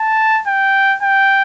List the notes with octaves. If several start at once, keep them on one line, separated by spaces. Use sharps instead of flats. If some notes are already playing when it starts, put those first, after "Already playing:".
Already playing: A5
G5
G5